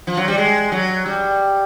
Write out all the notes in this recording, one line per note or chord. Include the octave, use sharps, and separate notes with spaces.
F3
F#3
G3
G#3
F#3
G3